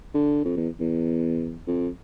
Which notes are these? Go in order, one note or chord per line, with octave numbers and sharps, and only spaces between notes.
D3
F2
E2
E2
F2